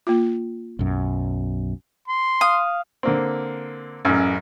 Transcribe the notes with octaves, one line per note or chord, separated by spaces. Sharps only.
A#3 F4
B1 F#2
C6
F5 D#6
D3 A#3 C4
A1 F#2